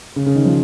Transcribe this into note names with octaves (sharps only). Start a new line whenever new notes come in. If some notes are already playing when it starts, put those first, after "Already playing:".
C#3
C#3
D#3
F3